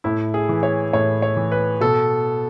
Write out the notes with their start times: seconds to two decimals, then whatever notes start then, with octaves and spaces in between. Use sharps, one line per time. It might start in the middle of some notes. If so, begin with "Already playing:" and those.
0.04 A2 E4
0.34 G#4
0.49 E3
0.63 C#5
0.93 A2 C#5
1.22 C#5
1.37 E3
1.52 B4
1.81 B2 A4